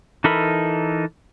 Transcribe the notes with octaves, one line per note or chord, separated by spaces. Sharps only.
E3 D#4 A4 A#4 B5